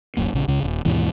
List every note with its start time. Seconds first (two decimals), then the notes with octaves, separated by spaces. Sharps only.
0.17 D1 F#2 A#3
0.33 A#1 C#3
0.48 C#2 C#3
0.63 D#1
0.85 D#2 G#2 B2 E3